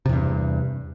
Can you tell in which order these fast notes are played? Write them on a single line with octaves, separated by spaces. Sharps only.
C3 E2 G2